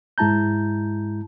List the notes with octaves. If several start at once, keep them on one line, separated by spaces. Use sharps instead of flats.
G#2 G#3 E4 A5 A#5 G6